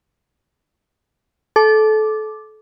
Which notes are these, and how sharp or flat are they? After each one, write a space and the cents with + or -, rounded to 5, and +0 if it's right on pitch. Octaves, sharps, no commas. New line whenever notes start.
A4 -25 D6 +0